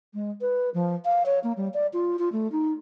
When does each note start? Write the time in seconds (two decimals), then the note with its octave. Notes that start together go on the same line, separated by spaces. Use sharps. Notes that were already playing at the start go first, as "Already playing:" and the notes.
0.14 G#3
0.41 B4
0.74 F3
1.05 F5
1.26 C#5
1.44 A#3
1.57 G3
1.74 D5
1.93 F4
2.19 F4
2.32 A3
2.52 D#4